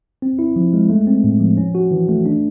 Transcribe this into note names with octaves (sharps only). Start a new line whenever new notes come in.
C4
E4
F3
G#3
A3
C4
A2
F3
C#4
F#4
E3
A3
D4